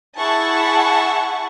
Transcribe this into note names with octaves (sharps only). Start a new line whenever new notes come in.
E4 G#4 F#5 A5 C#6